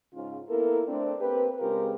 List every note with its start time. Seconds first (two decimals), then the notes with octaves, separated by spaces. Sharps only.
0.14 G#2 C#3 F4
0.49 A#3 B3 E4 A4 A#4
0.88 A3 C4 D4
1.20 A#3 C4 G4 B4
1.60 C#3 G#3 C4 F4 G4 A#4